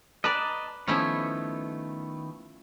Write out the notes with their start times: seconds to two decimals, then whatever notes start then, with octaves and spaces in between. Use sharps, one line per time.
0.24 B4 D5 D#5 A5 A#5
0.87 D#3 F3 A3 B3 C#4 E4